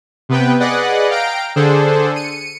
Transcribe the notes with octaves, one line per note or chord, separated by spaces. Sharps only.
C3 B3 B4 G5
G#4 B4 D5 D#5 F#5 F#6
F5 G5 A#5 D7
D3 D4 G#4 A4 C5
C#7 D#7